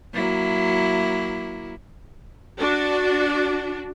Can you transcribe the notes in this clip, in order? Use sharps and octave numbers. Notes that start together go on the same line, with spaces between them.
F#3 A#3 E4
D4 F#4